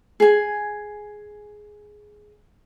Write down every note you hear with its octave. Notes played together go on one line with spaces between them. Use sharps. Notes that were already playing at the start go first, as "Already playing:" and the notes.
G#4 G#5